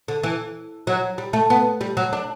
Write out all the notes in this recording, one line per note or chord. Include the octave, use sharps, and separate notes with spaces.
D3
E3
F#3
G3
A3
B3
G3
F#3
D4